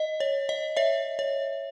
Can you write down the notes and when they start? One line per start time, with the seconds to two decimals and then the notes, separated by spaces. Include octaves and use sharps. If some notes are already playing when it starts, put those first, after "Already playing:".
Already playing: D#5
0.20 C#5
0.49 D#5
0.77 C#5 E5
1.19 C#5